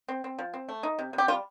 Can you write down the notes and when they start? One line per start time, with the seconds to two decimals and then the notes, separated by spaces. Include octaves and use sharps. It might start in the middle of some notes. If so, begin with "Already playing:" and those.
0.09 C4
0.24 C4
0.39 F3
0.54 C4
0.69 A3
0.83 D#4
0.99 C3
1.13 C3
1.18 G4
1.28 G3 F4